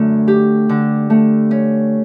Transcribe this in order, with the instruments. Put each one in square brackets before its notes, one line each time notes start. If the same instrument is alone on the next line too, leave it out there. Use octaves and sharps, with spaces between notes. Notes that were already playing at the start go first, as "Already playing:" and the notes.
Already playing: [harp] F#2 D3 A3
G4
D3
A3
C#4